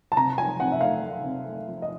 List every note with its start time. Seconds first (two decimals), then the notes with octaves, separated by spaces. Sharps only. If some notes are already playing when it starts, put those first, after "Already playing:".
0.12 A5
0.17 C3 A#5
0.38 F3 G#5
0.60 C3 F#5
0.72 E5
0.81 A3 F5
1.03 A3
1.24 C3
1.46 A3
1.68 F3
1.82 D#5